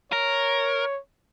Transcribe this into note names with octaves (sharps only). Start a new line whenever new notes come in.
A#4 C#5